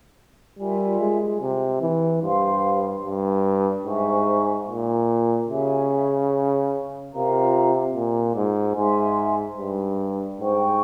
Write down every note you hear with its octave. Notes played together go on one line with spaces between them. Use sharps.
G3 F4 A#4 E5 G#5
G#3
C3
E3
G2 G4 C5 F5 C6
G2
G#2 C5 E5 G#5 C#6
A#2
C#3 G4 C#5 E5 G#5
C3 F4 A#4 F5 A#5
A#2
G#2
G#2 G#4 E5 G#5 C6
G2
G#2 C5 G5 C#6